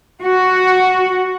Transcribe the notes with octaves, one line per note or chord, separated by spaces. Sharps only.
F#4